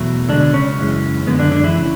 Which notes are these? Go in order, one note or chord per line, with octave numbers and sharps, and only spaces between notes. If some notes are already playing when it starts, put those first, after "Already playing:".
Already playing: E2 B2 F#3 A3
B2 D3 G#3 D4
C#3 C#4
F#2 E3 G#3
F#2 D3 G#3 B3
D3 D4
D3 D4
E3 E4
C#3 E3